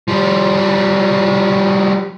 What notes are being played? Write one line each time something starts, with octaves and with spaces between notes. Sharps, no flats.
F3 G3